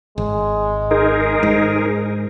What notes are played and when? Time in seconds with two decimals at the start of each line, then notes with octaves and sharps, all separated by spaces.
0.18 G#1 G#3
0.91 D#4 G#4 A#4
1.43 G#2